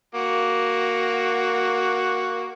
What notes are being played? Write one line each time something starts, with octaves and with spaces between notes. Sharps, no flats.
A#3 F#4